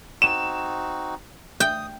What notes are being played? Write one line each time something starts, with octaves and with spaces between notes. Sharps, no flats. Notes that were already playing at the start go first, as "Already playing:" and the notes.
C4 D#4 F#4 E7
G5 D#6